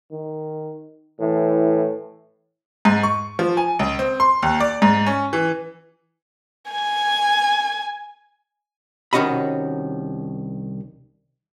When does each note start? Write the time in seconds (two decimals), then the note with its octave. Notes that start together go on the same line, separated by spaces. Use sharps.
0.12 D#3
1.20 A2 E3
2.85 G#2
3.03 C#6
3.39 F3
3.57 G#5
3.79 C#2
3.99 C4
4.20 C6
4.42 D#2
4.60 D5
4.82 G#2
5.06 C#4
5.33 E3
6.70 G#5 G#6
9.13 C2 D#3 C#4 F#4 D#5 B5